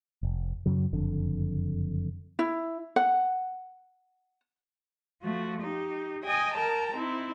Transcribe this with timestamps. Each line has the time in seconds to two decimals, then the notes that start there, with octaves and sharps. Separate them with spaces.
0.23 F1
0.66 F#2 C#3 F#3
0.93 F#1 F2 D3
2.39 E4
2.96 F#5
5.22 F3 A3 F#4
5.61 D#4 G4
6.24 D#5 G5 G#5 D#6
6.54 A#4 G5 A5 A#5
6.95 C4 D#4 E4